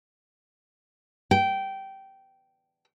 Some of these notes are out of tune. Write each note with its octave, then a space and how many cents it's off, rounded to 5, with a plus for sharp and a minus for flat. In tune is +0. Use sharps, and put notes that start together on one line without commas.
G5 -15